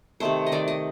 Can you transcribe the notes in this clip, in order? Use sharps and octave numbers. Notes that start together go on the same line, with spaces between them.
C3 D#3 A3 C5
D#5
D#3 A3 D5
D#5